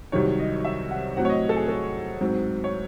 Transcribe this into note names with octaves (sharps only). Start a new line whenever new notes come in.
C2 C3 D#3 F#3 C#5
D#5
E5
F#5
A2 F#3 C4 F#5
C#5
D#5
A4
G#4
A4
G#2 F#3 C4
C#5